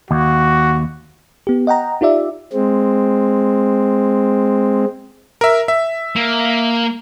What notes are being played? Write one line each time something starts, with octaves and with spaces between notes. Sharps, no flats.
D#2 F#4
B3 G4
D#5 F#5 G5 A#5
D#4 F4 G4 D5 E5
G#3 C4
A#4 E5
E5
A#3